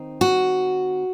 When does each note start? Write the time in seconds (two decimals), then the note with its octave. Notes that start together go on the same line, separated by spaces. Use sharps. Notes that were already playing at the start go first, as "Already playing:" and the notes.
Already playing: D#3 C4 D#4
0.21 F#4